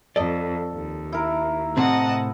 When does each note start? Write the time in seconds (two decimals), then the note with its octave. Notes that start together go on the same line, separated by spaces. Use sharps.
0.16 F2 A4 D5 D#5
0.74 D#2
1.12 E4 A#4
1.77 A2 C3 C4 D#5 F#5 A5